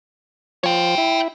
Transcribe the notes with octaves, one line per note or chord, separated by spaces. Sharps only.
F3 C#5 G5
E4